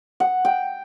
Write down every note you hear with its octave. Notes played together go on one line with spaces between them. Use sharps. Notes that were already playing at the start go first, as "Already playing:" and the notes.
F#5
G5